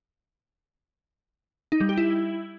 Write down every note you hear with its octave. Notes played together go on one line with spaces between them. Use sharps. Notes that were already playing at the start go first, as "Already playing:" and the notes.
D#4
G3
G4
E4